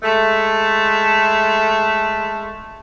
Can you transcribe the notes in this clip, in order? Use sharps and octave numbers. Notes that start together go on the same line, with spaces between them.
G#3 A3